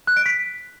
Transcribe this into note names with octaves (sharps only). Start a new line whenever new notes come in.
F#6
D7
B6